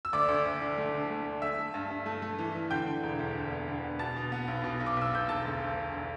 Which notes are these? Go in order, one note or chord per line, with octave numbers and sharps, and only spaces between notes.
E6
D2 D5 D6
D2
D2
D3
A3
D3
A3
D2
A3 E5 E6
A3
G2
G2
A3
A3
E3
E3
D3 G5 G6
D3
E1
D2
D3
B3
D3
B3
B2 A5 A6
B2
B3
B1
B2
B1
D6
B1 E6
B1 G6
E1 A5 A6
D2
D2
E1
D3